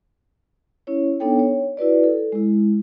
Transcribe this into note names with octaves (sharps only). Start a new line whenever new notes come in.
C#4 E4 C#5
B3 D4 D#4 A4 C#5 G5
C#5
E4 F#4 B4 D5
A4
G#3 E4